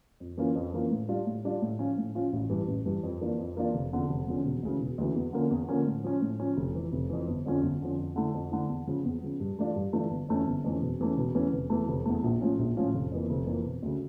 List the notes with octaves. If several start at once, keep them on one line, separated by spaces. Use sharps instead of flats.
F2
E3 A#3 C#4 F4
F2
E3 A#3 C#4 F4
A2
G3 D4 F4
A2
G3 D4 F4
A2
F3 C#4 F4
A2
F3 C#4 F4
A1
G2 E3
A1
G2 E3
F2
E3 A#3 D4 F4
F2
E3 A#3 D4 F4
F1
E2 D3 F3 C#4
F1
E2 D3 F3 C#4
E1
D2 C#3 E3
E1
D2 C#3 E3
E2
D3 F3 A#3 C#4
E2
D3 F3 A#3 C#4
A2
F3 C#4
A2
F3 C#4
F1
F2 E3
F1
F2 E3
G1
F2 D3 F3 C#4
G1
F2 D3 F3 C#4
F2
D3 A3 E4
F2
D3 A3 E4
E2
C#3 F3
E2
C#3 F3
G2
E3 A3 D4 F4
G2
E3 A3 D4 F4
G1
F2 E3 A3 C#4
G1
F2 E3 A3 C#4
E1
E2 E3 A3 C#4
E1
E2 E3 A3 C#4
F1
E2 E3 A3
F1
E2 E3 A3
A#1
A2 F3 C#4 F4
A#1
A2 F3 C#4 F4
F1
F2 E3 A#3
F1
F2 E3 A#3
E1
D2 C#3